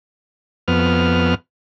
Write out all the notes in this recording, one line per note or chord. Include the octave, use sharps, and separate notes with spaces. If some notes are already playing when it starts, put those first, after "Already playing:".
F2 B3 F6